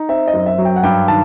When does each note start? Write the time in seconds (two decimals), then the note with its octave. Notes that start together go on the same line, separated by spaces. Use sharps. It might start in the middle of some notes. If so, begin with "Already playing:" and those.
Already playing: D#4
0.09 C4 E5
0.28 D#5
0.33 F#2
0.46 E5
0.58 F#3
0.65 G5
0.76 F#5
0.83 G2 G5
1.08 D#3 A5